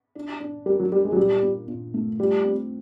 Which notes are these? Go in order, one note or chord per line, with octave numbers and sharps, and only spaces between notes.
D4
D4
G3 A#4
F#3
G3 A#4
G#3
F#3
A#2 G3
A#2
A#2
A3
G3 F4
C4